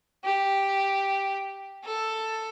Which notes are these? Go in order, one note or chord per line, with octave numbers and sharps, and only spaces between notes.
G4
A4